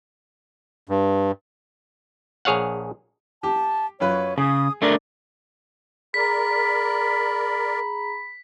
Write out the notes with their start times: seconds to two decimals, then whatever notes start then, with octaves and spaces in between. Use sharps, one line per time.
0.89 G2
2.45 A#1 G#4 C#5 F5 F#5
3.43 G4 A5
4.00 F#2 F4 B4 C#5
4.38 C#3 G#4 D#6
4.82 A3 D4 A#4 D5
6.14 G#4 A#4 D5 A#5 B5 B6